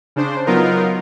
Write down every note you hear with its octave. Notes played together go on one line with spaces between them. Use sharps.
C#3 D4 C5
F#3 B3 D#4 F4 A#4